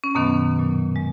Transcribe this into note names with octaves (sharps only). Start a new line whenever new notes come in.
C#4
F#2 B2 D#3 F#3 B3
A#2 F#3
G#3